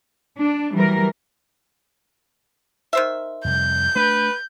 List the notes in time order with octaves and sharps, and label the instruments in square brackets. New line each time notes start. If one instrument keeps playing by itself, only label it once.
[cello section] D4
E3 F#3 G3 A#4
[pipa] D#3 C5 E5
[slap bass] F2 C3 G3 [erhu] G6
[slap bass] A3 D4 [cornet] B4